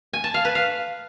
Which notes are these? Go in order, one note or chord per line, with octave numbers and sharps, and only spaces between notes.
G#5
A5
F5
B4
F5